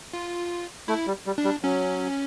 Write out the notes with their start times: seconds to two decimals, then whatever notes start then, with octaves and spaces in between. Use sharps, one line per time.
0.13 F4
0.88 A3 E4
1.07 G3
1.26 G3
1.38 D4
1.44 G3
1.63 F#3 C#4